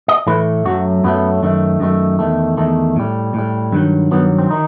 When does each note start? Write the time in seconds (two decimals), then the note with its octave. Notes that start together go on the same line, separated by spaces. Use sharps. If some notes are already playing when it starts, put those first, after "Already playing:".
0.08 D#5
0.27 A2 E3 A3 B4
0.65 F#2 F#3 A3 F#4
1.04 F#2 F#3 A3 B3
1.43 F#2 D#3 A3
1.80 F#2 D#3 A3
2.19 E2 D#3 A3
2.57 E2 D#3 A3
2.96 A2 G3
3.34 A2 G3
3.72 G2 D#3 F#3
4.11 G2 D#3 F#3 B3
4.39 C4
4.51 D#3 D#4